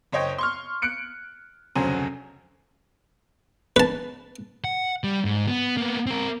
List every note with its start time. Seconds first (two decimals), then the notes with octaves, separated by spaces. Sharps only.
0.12 F#1 C5 C#5 D#5 G5
0.38 C6 C#6 F6
0.82 F#6 C#7 D7
1.75 F1 D2 C#3 F#3 C5 G#5
3.76 B4 A5
4.64 F#5
5.04 G3
5.25 G#2
5.48 B3
5.77 A#3 B3
6.07 C4 A#4